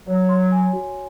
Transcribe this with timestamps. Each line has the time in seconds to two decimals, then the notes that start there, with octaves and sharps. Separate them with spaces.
0.07 F#3 C#5
0.29 C6
0.52 G#5
0.73 F#4